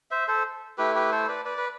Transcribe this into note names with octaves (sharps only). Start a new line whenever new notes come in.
C5 E5
A4 C5
A3 E4 G4 B4
G4 B4
A4 C5
B4 D5
B4 D5
B4